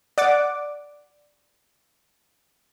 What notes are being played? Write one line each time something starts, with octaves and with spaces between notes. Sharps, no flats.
D5 F#5 D6